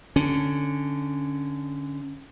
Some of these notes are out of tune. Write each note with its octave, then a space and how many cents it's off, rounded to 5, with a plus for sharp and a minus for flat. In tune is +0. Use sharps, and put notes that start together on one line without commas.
D3 +0 C#4 +0